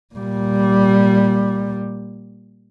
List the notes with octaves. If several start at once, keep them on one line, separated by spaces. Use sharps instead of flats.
A#2 G3